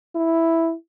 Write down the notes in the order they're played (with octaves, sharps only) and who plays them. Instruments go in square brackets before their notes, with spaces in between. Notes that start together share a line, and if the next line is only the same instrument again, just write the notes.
[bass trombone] E4